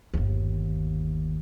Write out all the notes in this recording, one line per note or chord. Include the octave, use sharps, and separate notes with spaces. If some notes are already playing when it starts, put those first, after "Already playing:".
G1 D#2